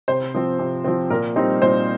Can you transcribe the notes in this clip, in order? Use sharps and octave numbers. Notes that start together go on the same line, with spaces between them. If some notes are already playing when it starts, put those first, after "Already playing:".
C3 C5
F3 C4
C3
F3 C4
A#2 A#4
G3 C4 D#4 C5
A#2 C5